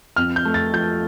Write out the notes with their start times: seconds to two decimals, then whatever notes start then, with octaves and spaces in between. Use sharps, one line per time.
0.16 F2 F6
0.36 G6
0.45 A3
0.54 A6
0.73 F3 G6